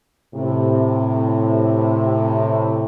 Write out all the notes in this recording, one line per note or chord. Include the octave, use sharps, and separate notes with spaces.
A2 C3